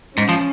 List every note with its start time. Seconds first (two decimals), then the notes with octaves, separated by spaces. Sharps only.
0.17 G#2 C#4
0.29 F3